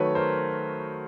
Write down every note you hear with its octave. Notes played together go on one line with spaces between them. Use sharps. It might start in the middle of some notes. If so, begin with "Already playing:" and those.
Already playing: D#3 F#3 A3 B4 C#5
A#4 C5